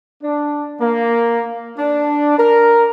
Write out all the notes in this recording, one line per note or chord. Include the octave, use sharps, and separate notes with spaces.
D4
A#3
D4
A#4